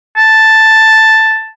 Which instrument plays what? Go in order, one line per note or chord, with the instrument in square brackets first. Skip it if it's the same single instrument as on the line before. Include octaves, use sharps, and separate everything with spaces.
[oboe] A5